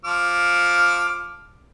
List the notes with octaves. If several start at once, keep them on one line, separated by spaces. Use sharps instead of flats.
F3 D6 F6